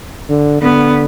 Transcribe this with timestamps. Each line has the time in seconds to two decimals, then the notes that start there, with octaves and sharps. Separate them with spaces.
0.30 D3
0.62 D3 B3